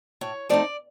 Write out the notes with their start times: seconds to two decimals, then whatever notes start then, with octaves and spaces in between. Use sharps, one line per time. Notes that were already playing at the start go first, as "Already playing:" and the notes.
0.21 A2 C#5
0.49 F3 A3 C4 D#4 D5